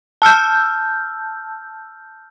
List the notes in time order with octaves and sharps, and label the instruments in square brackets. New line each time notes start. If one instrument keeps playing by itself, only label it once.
[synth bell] A5 E6 F6 G6